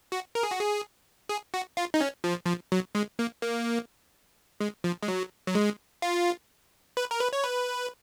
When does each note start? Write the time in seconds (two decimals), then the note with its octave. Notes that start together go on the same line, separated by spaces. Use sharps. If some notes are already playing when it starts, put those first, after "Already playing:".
0.12 F#4
0.35 A#4
0.43 G#4
0.51 F#4
0.59 G#4
1.29 G#4
1.54 F#4
1.77 F4
1.94 D#4
2.01 C#4
2.24 F3
2.45 F3
2.72 F#3
2.95 G#3
3.19 A#3
3.43 A#3
4.60 G#3
4.84 F3
5.03 G#3
5.08 F#3
5.47 F#3
5.55 G#3
6.02 F4
6.97 B4
7.11 A#4
7.21 B4
7.33 C#5
7.44 B4